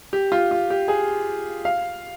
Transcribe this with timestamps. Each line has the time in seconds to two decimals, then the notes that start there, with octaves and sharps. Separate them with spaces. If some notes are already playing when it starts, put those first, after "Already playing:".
0.13 G4
0.32 F4
0.51 F4
0.70 G4
0.88 G#4
1.65 F5